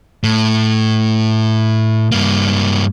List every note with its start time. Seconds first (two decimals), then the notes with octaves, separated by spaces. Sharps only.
0.24 A2
2.12 G2 A#3